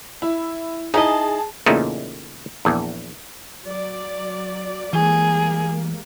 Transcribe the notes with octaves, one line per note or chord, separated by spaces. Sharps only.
E4
D#4 E4 G#4 D#5 A5
E2 A#2 C#3 A3 D#4
A#1 E2
F#3 D5
E3 G3 G#3 A#3 G#4